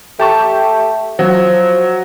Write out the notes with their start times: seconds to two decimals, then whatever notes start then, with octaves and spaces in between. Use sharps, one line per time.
0.19 A3 G4 A5 C#6
1.19 F3 F#3